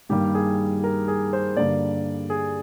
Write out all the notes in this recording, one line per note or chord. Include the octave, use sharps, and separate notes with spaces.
G2 D#3 G3 A#3 G4
G#4
A#4
G#4
C5
G2 D3 G3 A#3 D5
G#4